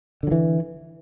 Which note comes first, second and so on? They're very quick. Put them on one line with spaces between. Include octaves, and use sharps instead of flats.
D3 F#3 E3